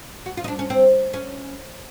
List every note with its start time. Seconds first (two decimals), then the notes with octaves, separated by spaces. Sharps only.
0.26 F#4
0.37 F4
0.44 D#4
0.48 D4
0.59 C#4
0.70 C4
1.14 C#4